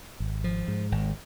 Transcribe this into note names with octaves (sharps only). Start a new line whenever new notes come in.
G#1
F3
G#2
G#1